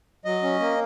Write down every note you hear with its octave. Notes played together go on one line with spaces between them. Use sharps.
F#3 D#5
C#4
A#3